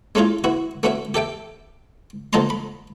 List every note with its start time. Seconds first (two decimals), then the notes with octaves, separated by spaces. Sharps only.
0.15 G#3 A3 C#4 E4 F4 G#4
0.44 B3 E4 F#4
0.83 A3 B3 C#4 F#4 E5
1.14 G4 A4 E5 G5
2.33 D3 F3 D#5 A5 A#5 C6
2.50 B5